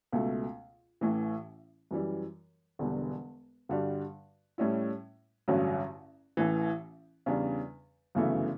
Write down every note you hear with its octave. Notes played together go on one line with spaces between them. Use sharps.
C#2 B2 A3
A1 A2 E3
F#2 E3 G3
E1 E2 D3 G3
G2 D3 G3 D4 F#4
A2 G3 C#4 E4
A1 G2 D3 F#3 C#4
A1 A2 E3
E2 C#3 G3 D4
G1 F#2 C#3 E3 A3